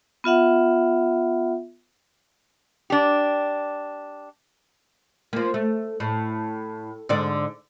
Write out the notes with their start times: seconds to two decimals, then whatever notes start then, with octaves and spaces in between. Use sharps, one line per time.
0.24 B3 F4 E5 F#5
2.90 D4 G4
5.33 F3 A#3
5.54 A3
6.00 A2
7.09 G#2 D3 D5